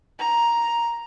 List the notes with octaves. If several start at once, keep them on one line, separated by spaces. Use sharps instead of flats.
A#5